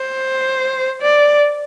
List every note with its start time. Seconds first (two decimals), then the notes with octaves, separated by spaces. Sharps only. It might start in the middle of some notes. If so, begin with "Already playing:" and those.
Already playing: C5
1.02 D5